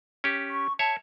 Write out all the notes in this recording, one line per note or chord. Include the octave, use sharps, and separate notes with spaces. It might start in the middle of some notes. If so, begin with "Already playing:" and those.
C#4 G4
C#6
C#5 E5 A5